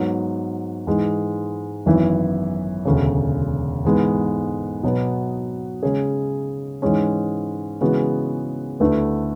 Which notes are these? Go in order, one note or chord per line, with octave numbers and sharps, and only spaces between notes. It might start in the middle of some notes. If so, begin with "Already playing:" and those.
Already playing: G#2 F#3 B3
G#2 E3 G#3
G#1 F#2 E3 B3 E4
E1 D2 C#3
G#2 E3 G#3 B3
B2 F#3 B3
C#3 G#3 C#4 G#4
G#2 E3 G#3 C#4
C#3 E3 G#3 B3 F#4
D2 D3 A3 E4 B4